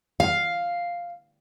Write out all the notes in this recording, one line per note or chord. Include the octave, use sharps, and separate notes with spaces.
F5